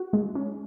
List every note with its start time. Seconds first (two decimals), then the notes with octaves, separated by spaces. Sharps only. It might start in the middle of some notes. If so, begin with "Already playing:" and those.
Already playing: F#4
0.13 G#3
0.35 C#4